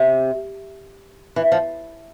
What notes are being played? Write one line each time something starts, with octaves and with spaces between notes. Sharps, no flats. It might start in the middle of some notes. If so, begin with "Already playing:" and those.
Already playing: C3
E3
F3